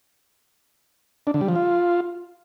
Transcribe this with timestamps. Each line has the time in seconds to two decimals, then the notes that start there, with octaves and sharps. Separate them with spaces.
1.27 D4
1.34 D3
1.41 G3
1.48 F3
1.56 F4